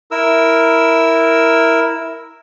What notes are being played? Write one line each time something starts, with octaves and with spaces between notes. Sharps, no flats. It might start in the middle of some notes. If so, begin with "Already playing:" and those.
E4 A#4 E6